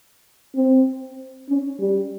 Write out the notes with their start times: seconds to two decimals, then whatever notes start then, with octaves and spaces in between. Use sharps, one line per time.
0.55 C4
1.49 C#4
1.80 G3